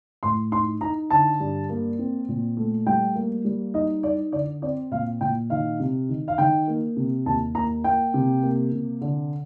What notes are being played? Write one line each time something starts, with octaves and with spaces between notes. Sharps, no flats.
A2 C6
D#4 C6
D#4 A#5
D3 A5
G2
A#3
C4
A#2
A3
G3 G5
A#3
G3
D#4 D#5
D#4 D5
D3 D5
C4 D5
A#2 F5
A#2 G5
D#3 F5
C3
D#3
F5
D#3 G5
A#3
C3
D#2 A5
A#3 A#5
A#3 G5
C3
A#3
C3
D3